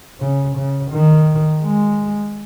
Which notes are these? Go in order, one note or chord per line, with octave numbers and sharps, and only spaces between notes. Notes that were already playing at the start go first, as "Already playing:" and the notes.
C#3
C#3
D#3
G#3